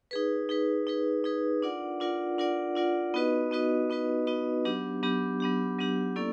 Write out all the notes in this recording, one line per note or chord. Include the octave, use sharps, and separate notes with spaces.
D#4 G#4 B4
D#4 G#4 B4
D#4 G#4 B4
D#4 G#4 B4
D4 F4 A#4 D5 F#5
D4 F4 A#4 D5 F#5
D4 F4 A#4 D5 F#5
D4 F4 A#4 D5 F#5
B3 D#4 F#4 B4 D#5
B3 D#4 F#4 B4 D#5
B3 D#4 F#4 B4 D#5
B3 D#4 F#4 B4 D#5
F#3 B3 D4 G4
F#3 B3 D4 G4
F#3 B3 D4 G4
F#3 B3 D4 G4
A#3 C#4 E4 A4 D5